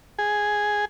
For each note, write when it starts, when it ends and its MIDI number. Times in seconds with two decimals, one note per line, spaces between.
0.19 0.85 68